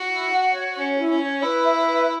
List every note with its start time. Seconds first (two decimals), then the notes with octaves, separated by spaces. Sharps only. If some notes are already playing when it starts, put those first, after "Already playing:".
Already playing: F#4
0.10 E4
0.32 F#5
0.53 C#5
0.76 C#4 C#5
0.98 E4
1.09 C#4
1.20 C#5
1.42 E4 B4
1.64 E5
1.86 B4